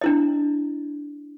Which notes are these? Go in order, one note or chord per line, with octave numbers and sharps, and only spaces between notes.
D4 E4 D#5